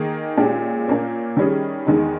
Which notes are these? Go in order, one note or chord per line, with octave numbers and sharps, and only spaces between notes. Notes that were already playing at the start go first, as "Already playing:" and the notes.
Already playing: D#3 A#3 D#4 G#4
A#2 G#3 C#4 G4
A#2 A#3 C#4
D#3 G3 C#4 G#4
E2 D#3 G#3 D#4